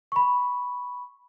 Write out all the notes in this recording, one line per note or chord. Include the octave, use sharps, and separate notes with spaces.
B5 C#6